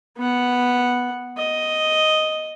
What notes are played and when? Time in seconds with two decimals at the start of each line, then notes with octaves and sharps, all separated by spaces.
0.18 B3 F#5
1.37 D#5